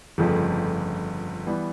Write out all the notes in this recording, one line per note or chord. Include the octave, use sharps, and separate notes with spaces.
G1 F2 C#3 F3 A3
E3 G3 B3